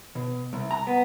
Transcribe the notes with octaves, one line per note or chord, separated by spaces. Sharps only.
B2
C2
A#5
B3